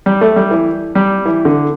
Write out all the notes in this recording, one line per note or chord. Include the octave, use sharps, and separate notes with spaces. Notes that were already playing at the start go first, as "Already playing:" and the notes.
G3
A3
G3
E3
G3
E3
D3